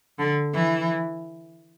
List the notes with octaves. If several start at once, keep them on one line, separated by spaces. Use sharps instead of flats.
D3
E3